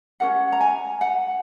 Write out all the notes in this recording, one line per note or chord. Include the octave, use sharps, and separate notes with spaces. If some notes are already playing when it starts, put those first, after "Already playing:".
C#4 F#4 A#4 F#5
A#5
G#5
F#5